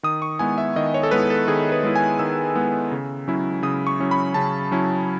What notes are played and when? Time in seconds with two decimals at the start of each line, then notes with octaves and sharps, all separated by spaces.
0.03 D#3 D#6
0.22 C#6
0.39 G#3 B3 E4 G#5
0.58 E5
0.76 D#3 D#5
0.94 C#5
1.03 A4
1.11 G#3 B3 E4 B4
1.30 A4
1.48 D#3 G#4
1.72 B4
1.83 G#3 B3 E4
1.96 G#5
2.19 D#3 E6
2.55 G#3 B3 E4
2.91 C#3
3.28 F#3 C#4 E4
3.63 C#3 D#6
3.87 C#6
3.99 F#3 C#4 E4
4.11 B5
4.34 C#3 A5
4.71 F#3 C#4 E4